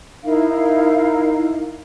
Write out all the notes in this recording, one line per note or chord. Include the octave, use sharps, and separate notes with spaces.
D#4 E4 A#4 F5